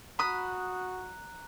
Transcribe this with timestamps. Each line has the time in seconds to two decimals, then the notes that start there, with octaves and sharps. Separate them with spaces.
0.19 F#4 A#5 B5 D#6 F#6